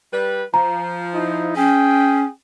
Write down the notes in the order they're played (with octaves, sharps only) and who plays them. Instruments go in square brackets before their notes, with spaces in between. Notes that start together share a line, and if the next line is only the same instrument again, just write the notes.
[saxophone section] G3 B4
[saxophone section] F3 [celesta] A#5
[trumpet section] D#4 E4
[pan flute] C#4 [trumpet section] G#4 G5